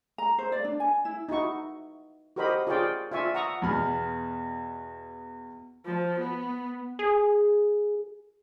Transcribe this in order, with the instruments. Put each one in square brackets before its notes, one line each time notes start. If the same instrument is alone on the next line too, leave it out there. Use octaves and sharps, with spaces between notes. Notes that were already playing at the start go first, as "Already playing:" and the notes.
[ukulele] A#5
C5
D5
D4
G#5
E4
[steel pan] D#4 E4 F#4 C#6
F#4 G4 A#4 C5 D#5 B5
F4 G#4 A#4 C#5 D5 G5
F4 D5 E5 G#5 C#6
F#5 A#5 C#6 D#6 E6
[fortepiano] E2 B2 B5 F6
[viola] F3
B3
[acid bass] G#4